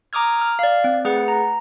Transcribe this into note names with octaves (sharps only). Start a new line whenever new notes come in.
A#5 D6 D#6 F6 G#6
F6
D5 F5
C4
A3 G#4 B4 F#5
A#5